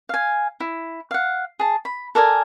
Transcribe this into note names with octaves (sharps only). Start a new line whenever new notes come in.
F5 G#5
E4
F5 F#5
G#4 A5
B5
A4 A#4 D5 G#5